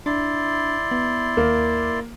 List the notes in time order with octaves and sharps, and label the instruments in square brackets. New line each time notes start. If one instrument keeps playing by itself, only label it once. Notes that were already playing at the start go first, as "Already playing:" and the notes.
[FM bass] D4 [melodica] E4 D5 C6
[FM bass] B3
[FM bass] D#2 [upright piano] A#3